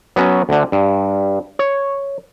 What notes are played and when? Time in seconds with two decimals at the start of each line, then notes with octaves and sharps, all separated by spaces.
0.16 F#3 B3 C#4 F#4
0.49 D2 D3
0.72 G2
1.59 C#5